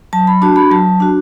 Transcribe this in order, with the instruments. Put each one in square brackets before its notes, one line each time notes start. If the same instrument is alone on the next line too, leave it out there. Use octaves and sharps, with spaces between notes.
[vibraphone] F#3 A5
B5
D4 F#4 A5
B5
F#3 A5
D4 F#4